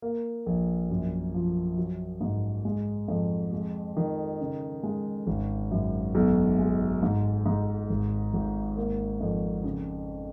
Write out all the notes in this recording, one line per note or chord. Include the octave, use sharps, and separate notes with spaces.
A#3
A#1
F#2
F3
F#3
G#2
G#3
F2
G#3
D#3
C#3
G#3
G#1
F#2
B1
G#3
G#2
G#2
G#1
G#1
A#3
F2
C#3